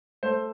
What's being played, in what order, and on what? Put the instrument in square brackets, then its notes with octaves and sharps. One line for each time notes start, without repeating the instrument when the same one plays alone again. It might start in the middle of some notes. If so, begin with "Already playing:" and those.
[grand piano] A3 C5